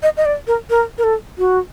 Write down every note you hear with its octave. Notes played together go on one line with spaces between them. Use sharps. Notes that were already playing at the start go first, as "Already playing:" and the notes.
D#5
D#5
D5
A#4
A#4
A#4
A4
F#4